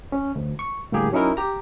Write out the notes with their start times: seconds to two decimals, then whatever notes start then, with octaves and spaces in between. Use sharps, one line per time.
0.12 C#4
0.36 D2
0.59 C#6
0.92 A2 D3 G3 A#3 G4 G#4
1.12 F#3 C#4 D#4 E4 A#4
1.37 G4 A#5